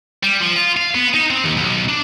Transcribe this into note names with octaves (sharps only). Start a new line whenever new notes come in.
G3
F3
F4
F5
B3
D#4
C4
D#2
B1
D4